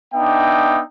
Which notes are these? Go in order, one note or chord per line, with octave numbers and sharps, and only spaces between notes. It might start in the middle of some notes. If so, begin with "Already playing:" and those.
B3 D4 D#4 E5 G5